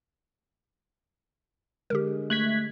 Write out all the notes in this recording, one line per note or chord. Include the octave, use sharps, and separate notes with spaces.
D3 G#3 G4 A#4
A3 F#6 G#6 B6